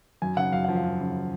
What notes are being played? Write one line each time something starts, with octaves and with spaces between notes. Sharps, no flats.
F#2 G#5
C#3 F#5
F#2 F5
F3 F#5
F5
F#2
C#3